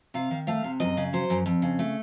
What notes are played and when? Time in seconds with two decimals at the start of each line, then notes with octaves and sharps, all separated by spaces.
0.14 C3 F5
0.31 D#3
0.47 A3 F5
0.64 C3
0.80 F#2 D#5
0.97 C#3
1.13 F#3 C5
1.30 F#2
1.46 F2
1.62 C#3
1.79 A3